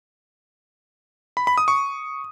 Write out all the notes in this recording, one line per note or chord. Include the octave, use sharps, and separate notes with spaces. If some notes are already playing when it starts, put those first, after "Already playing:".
B5
B5
D#6
C#6